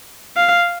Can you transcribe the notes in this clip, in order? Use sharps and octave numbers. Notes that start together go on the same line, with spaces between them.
F5